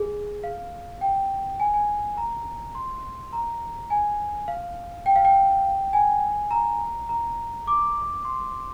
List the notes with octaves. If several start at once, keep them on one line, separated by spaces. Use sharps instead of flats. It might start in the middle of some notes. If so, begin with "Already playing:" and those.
Already playing: G#4
F5
G5
G#5
G#5
A#5
C6
A#5
G#5
F5
G5
F5
G5
G#5
A#5
A#5
D6
C6